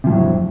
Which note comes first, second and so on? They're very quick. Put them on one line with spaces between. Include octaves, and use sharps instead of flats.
C3 F3 A2 F#3 F2